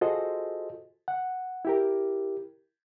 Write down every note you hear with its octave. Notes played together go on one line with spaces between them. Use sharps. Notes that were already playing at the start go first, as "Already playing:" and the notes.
F4 F#4 G#4 A4 C5 D#5
F#5
E4 G4 A#4